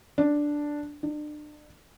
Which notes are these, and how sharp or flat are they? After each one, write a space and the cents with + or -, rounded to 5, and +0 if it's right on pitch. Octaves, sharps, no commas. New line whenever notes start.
D4 +0
D4 +35